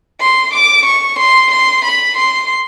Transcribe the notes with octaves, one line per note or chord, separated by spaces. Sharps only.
C6
D6
C#6
C6
C6
B5
C6